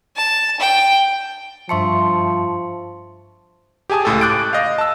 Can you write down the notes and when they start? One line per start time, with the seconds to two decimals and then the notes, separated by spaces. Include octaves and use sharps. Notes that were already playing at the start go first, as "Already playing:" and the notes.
0.16 A5
0.60 G5
1.69 G2 F3 E5 A5 C6 C#6 C#7
3.90 G4 G#4 G#5 A5 D#6
4.05 C#2 A2 A4
4.21 D6 F#6 G6 A6 D7
4.53 D#5 F5
4.78 A5 E6